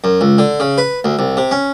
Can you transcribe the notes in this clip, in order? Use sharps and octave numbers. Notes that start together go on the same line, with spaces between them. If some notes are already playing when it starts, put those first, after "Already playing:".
F#2
C#2
D3
C#3
B4
D2
C2
C3
C#4